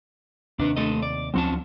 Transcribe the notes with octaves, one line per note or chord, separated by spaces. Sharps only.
D#2 C3 D4 B4
A3 A4 D#5
D5
D2 F3 F#3 C4 C#4 A5